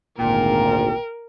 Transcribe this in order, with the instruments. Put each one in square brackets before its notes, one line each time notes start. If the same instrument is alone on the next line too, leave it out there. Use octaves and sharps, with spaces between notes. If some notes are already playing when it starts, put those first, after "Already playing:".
[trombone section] G#1 D2 [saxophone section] A#2 [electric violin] A#4 [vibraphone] G5